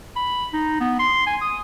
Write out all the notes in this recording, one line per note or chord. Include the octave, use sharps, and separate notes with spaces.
B5
D#4
B3
C6
G#5
D#6